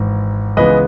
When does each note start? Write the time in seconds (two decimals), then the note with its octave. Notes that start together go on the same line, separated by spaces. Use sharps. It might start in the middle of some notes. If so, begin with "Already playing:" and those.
Already playing: G#1 G#2 E3
0.57 C#2 C#3 E3 G#3 B3 B4 D#5